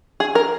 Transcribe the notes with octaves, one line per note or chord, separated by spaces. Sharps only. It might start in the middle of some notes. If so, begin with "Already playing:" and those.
G#4
A#4